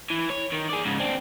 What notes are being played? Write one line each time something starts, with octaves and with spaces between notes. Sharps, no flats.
E3
C#5
D#3
G#4 D5
G#2 C#3
C4 D4